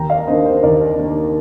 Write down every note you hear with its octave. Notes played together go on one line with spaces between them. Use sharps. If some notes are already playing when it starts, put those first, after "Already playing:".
Already playing: D#2 G5 A#5
D5 F5
D#3 A#3 D4 C5 D#5
C5
D#2 A#4 D5
D#3 A#3 D4